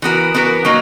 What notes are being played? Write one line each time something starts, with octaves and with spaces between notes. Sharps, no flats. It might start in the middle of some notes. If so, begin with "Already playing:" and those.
E3 B3 F#4 A#4
E3 B3 F#4 A#4
F#3 A#3 D#4